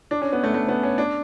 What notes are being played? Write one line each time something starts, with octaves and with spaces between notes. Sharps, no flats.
D4
C#4
B3
A3
A3
B3
C#4
D4